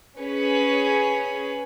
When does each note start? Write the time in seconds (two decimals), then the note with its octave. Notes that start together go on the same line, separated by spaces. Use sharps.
0.18 C#4 G#4 B4 C#5